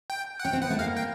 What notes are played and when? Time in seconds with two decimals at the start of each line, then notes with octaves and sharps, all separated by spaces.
0.10 G5
0.40 F#5
0.45 C#4 G5
0.53 C4
0.62 B3 F#5
0.70 A3
0.79 A#3 F5
0.97 G5